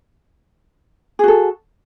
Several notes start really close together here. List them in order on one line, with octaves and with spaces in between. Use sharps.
G#4 F#4 A4